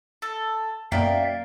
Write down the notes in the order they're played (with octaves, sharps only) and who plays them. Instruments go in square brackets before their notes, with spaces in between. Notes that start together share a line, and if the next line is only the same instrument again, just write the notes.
[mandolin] A4
[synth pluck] F#2 B2 [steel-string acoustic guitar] A#3 [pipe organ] D5 E5 F5 [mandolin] G5